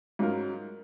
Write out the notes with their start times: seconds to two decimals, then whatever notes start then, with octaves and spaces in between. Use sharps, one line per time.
0.19 G#2 F#3 C#4 F4 A#4